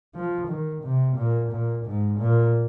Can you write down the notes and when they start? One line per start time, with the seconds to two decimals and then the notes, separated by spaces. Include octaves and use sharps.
0.15 F3
0.48 D#3
0.84 C3
1.17 A#2
1.51 A#2
1.86 G#2
2.20 A#2